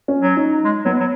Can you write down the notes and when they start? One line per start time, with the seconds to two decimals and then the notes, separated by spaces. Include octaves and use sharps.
0.08 C#4
0.22 F#3
0.37 D#4
0.65 G#3
0.85 F#3 B3
1.00 F#3